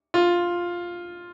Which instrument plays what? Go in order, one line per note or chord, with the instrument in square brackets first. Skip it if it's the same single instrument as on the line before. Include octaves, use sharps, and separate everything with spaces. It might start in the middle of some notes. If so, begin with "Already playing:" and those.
[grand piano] F4